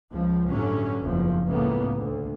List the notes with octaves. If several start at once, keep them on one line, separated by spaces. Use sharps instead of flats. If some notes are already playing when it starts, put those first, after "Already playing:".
C#2 F3
G1 A2 D3 F#3 C#4
F#1 E2 F3
C#2 A2 C#3 A#3 B3
D2